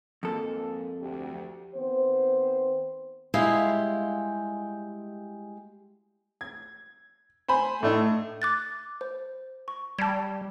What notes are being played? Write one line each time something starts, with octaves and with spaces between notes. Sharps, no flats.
F2 G#2 A#3 A4
D2 G4
D#3 B3 C4 C5
G3 G#3 E4 F4 G4 F5
G#6
C5 G#5 B5
A2 A3 D4 D#4
D6 F#6 A6
C5
C#6
G3 A5 G#6